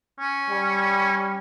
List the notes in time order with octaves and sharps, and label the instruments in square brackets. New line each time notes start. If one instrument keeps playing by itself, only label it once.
[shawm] C#4
[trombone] G3